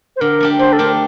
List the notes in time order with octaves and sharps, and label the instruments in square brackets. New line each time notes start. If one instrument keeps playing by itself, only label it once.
[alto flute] C5
[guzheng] D3 [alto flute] A#4
[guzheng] A3 D4 G4
[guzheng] D3 [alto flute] C5
[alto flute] A4
[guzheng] A3 D4 G4 [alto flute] A#4